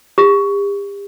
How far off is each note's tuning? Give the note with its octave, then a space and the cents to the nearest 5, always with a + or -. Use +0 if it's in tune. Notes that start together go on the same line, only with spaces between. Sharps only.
G4 +40